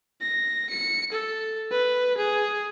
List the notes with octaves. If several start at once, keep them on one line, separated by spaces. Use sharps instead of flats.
A#6
C#7
A4
B4
G#4